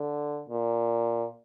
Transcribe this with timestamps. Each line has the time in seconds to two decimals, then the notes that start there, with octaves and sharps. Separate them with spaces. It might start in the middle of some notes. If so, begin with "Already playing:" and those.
Already playing: D3
0.49 A#2